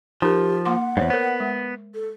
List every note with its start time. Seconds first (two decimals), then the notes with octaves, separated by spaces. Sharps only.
0.22 F3 D#4 G4 A#4
0.65 A#3 F#5 C6 D6
0.97 E2 G2 C5 C#5
1.10 B3 A#4 C5
1.40 G#3
1.94 A4